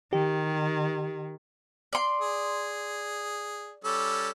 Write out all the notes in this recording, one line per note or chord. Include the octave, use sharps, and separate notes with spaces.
D#3 G4
D5 C6
G#4
G3 C#4 A4